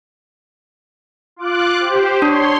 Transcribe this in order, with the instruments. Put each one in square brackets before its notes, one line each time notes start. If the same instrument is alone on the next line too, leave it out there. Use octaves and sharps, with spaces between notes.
[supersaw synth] F4 D6 F#6
G4 C5
[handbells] D4 [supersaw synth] C#5 C6